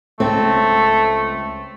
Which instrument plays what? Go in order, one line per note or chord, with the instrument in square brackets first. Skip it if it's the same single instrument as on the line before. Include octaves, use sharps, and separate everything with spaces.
[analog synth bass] C#2 [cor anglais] A3 [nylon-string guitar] C4